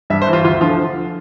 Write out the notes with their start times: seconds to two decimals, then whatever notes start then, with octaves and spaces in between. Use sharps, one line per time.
0.10 G2 E5
0.22 C5
0.27 E3
0.33 F4
0.44 D2 F4
0.61 D3 F3 F4